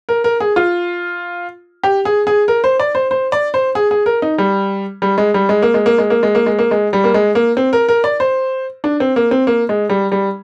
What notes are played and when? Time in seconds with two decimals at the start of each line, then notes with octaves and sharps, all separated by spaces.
0.09 A#4
0.24 A#4
0.40 G#4
0.56 F4
1.84 G4
2.05 G#4
2.27 G#4
2.48 A#4
2.64 C5
2.80 D5
2.95 C5
3.11 C5
3.32 D5
3.54 C5
3.75 G#4
3.91 G#4
4.06 A#4
4.22 D#4
4.38 G3
5.02 G3
5.18 G#3
5.34 G3
5.49 G#3
5.62 A#3
5.74 G#3
5.86 A#3
5.98 G#3
6.10 A#3
6.23 G#3
6.35 A#3
6.46 G#3
6.59 A#3
6.71 G#3
6.93 G3
7.04 A#3
7.14 G#3
7.35 A#3
7.57 C4
7.73 A#4
7.89 A#4
8.04 D5
8.20 C5
8.84 D4
9.00 C4
9.16 A#3
9.31 C4
9.47 A#3
9.69 G#3
9.90 G3
10.12 G3